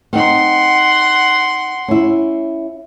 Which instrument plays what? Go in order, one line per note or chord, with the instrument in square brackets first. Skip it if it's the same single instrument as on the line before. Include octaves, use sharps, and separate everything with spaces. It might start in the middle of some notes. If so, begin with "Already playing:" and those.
[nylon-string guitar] C4 D#4 [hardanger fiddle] F#5 C6
[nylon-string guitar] C#4 E4